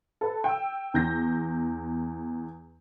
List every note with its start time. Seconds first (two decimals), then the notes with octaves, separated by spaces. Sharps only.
0.21 A4 B4
0.44 G5 E6
0.94 E2 G6 A#6